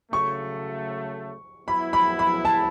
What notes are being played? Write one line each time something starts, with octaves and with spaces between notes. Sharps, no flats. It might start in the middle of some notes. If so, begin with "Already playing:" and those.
C#3 F#3 A3 C#6
F#3 B3 E4 B5
B5
B5
A5